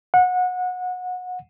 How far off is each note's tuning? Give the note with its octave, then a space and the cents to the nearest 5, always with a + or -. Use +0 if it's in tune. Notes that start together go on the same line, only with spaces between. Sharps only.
F#5 -25